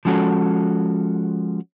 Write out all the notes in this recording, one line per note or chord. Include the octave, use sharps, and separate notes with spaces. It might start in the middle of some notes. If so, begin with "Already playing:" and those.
F3 G#3 C#4 F#4 A4